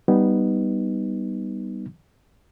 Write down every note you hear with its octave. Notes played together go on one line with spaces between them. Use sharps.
G3 B3 D#4